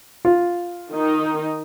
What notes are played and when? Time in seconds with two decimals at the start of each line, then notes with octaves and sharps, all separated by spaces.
0.25 F4
0.92 D#3 D#4